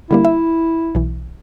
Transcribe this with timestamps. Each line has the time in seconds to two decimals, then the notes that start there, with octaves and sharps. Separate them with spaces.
0.11 D3 G3 A#3 E4
0.25 E5
0.95 B1 E3